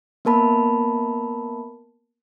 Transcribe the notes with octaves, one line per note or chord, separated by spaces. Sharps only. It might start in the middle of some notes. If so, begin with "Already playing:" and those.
A#3 B3 A#4 A5 B5